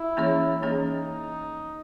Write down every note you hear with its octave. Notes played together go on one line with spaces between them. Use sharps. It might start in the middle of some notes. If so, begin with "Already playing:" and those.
Already playing: E4
E3 A#3 C#4 G#4 C#5
E3 A#3 C#4 D#4 G#4 C#5